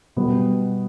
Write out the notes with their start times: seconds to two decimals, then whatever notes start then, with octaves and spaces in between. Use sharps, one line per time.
0.17 B2 G3 B3